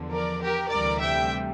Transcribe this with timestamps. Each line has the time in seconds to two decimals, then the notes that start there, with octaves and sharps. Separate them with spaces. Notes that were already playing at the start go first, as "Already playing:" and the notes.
Already playing: E2 D3 F3
0.11 A#4 D5
0.41 G4 A#4
0.69 D2 C3 E3 G3 A#4 D5
0.99 E5 G5